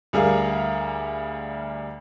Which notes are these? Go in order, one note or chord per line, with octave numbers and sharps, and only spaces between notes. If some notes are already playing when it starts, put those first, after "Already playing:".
D2 G3 G#4 A#4 F5